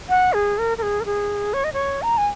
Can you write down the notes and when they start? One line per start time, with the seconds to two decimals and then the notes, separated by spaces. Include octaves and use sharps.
0.09 F#5
0.33 G#4
0.58 A#4
0.78 A#4
0.82 G#4
1.00 A#4
1.05 G#4
1.54 C#5
1.64 D#5
1.73 C#5
2.02 A#5
2.18 G#5